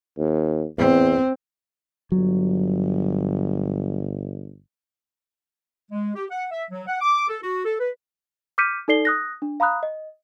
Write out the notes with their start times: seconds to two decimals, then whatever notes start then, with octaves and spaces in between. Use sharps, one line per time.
0.18 D#2
0.78 E2 C4
2.12 G1 F#3
5.91 G#3
6.15 G4
6.30 F#5
6.51 E5
6.71 F#3
6.87 F#5
7.01 D6
7.28 A4
7.43 F#4
7.65 A4
7.79 B4
8.58 D6 F6 G6 B6 C#7 D#7
8.88 D#4 A4 D5 C7 G7
9.05 D#6 F#6 A#6
9.42 D4
9.60 F5 A#5 B5 D#6 F#6
9.83 D#5